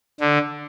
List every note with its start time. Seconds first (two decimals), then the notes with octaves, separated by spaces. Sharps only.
0.21 D3